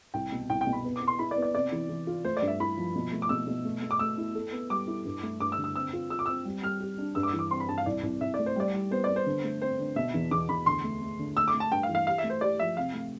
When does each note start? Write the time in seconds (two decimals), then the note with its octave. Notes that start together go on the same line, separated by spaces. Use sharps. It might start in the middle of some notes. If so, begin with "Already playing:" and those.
0.14 C2 G5
0.32 B2
0.49 C2 G5
0.61 G5
0.67 B2
0.73 B5
0.85 B3
0.96 D6
1.01 B3
1.08 C6
1.19 E4 B5
1.31 D5
1.37 B3
1.42 D5
1.54 C3 D5
1.72 E3
1.89 E3
2.07 F4
2.24 A3 C5
2.37 D5
2.42 G2
2.48 E5
2.60 E4 B5
2.77 F3
2.95 B2
3.12 A3
3.22 D6
3.29 B2 E6
3.47 B2
3.65 A3
3.82 A3
3.91 D6
3.99 A3 E6
4.18 E4
4.35 A4
4.52 B3
4.70 G3 D6
4.88 E4
5.05 G2
5.23 A3
5.40 G2 D6
5.52 E6
5.58 D3
5.64 E6
5.76 C4 E6
5.93 F4
6.10 F4 E6
6.19 D6
6.26 C4 E6
6.45 G3
6.63 G3 F6
6.80 G4
6.98 D4
7.15 G2 E6
7.23 D6
7.28 E6
7.33 E3
7.39 D6
7.51 C4 C6
7.60 B5
7.68 G2 A5
7.78 F5
7.86 C2 D5
8.03 C2
8.21 C2 E5
8.34 D5
8.39 A3
8.46 C5
8.56 G3 D5
8.73 G3
8.91 B3 C5
9.04 B3 D5
9.16 C5
9.26 D3
9.44 A3
9.61 C4 C5
9.79 D3
9.96 B2 E5
10.14 E2
10.31 E2 D6
10.49 E2 B5
10.66 D2 C6
10.84 A3
11.01 A3
11.19 D3
11.36 A3 E6
11.48 D6
11.54 A3
11.60 A5
11.72 G2 G5
11.83 F5
11.89 E3
11.95 F5
12.07 G4 F5
12.18 E5
12.24 A3
12.30 C5
12.41 G4 D5
12.59 F3 E5
12.77 C3 F5
12.94 A3